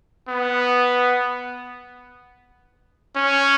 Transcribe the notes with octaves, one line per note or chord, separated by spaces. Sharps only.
B3
C#4